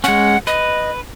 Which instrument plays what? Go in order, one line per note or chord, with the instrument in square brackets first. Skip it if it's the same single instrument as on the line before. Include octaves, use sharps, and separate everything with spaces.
[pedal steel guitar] G#3 C#4 [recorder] F#5
[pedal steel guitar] B4 [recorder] D#5